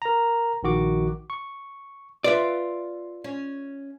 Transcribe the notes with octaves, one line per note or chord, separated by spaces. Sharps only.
A#4 A#5
A#1 D#3 F#4 D6
C#6
F4 B4 D5 E5
C#4